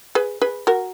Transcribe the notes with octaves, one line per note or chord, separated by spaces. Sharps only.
G#4 B4
G#4 B4
F#4 A#4